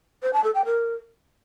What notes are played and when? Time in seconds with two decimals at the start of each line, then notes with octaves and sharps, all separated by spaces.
0.23 C5
0.33 A5
0.44 A4
0.55 G5
0.65 A#4